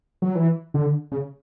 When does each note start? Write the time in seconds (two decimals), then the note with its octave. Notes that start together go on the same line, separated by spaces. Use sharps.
0.22 F#3
0.35 E3
0.74 D3
1.12 C#3